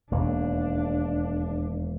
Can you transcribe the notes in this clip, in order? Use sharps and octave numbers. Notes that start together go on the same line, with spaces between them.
E1 D#2 A#3 D4